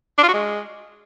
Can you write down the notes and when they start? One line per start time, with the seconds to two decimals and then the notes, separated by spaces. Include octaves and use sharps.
0.18 D4
0.23 F4
0.28 F#4
0.34 G#3